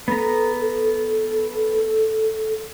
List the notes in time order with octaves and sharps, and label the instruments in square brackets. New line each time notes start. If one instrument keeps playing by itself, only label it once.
[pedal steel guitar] B3 A#5 [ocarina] A4